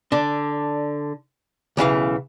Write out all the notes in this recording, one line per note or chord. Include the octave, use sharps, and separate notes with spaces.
D3 D4
B1 C#3 E3 F5